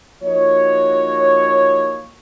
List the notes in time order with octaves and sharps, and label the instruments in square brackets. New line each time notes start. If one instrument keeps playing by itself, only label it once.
[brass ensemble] F3 A#3 D#4 F#4 C#5